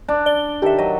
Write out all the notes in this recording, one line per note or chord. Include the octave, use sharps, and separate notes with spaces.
D4
D5 G7
D#3 G4 A4 E5
F#3 D#5